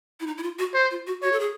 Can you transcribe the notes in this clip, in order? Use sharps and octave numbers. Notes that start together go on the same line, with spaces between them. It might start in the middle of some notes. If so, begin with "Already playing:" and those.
E4
D#4
E4
F4
F#4
C5
F4
F#4
F#4 C#5
A4
G#4